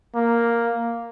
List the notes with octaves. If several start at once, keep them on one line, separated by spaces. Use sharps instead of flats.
A#3